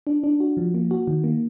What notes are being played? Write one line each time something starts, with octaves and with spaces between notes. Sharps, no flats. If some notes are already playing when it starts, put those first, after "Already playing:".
D4
D4
F#4
F3
A#3
F#4
D#3
A#3